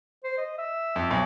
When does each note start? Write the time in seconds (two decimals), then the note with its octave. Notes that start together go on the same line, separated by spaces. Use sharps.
0.24 C5
0.38 D#5
0.58 E5
0.96 F2
1.11 B1